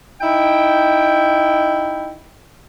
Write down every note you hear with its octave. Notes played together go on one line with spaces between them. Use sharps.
D#4 E4 G5